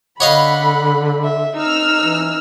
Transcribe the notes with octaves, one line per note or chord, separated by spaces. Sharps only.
D3 C#5 D#5 F5 F#5 B5
E5
D#4 E6 F6
E3